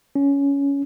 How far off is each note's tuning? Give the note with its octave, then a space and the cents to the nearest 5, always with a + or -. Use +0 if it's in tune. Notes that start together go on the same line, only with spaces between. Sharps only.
C#4 +15